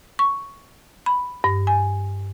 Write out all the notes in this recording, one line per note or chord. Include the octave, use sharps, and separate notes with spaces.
C#6
B5
G2
G#5